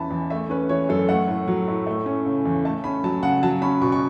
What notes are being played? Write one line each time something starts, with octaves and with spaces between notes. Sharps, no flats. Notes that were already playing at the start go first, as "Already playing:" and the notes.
Already playing: E2 E3 C#4 A5 B5
E2
A3 E5
C#4 B4
E3 C#5
F#2 A4
A3 F#5
A2
F#3
A2
A3
C#4
C#3
E2
A3 A5
C#4 B5
F#3 A5
C#3 F#5
F#3 A5
C#4 B5
B2 C#6
C#6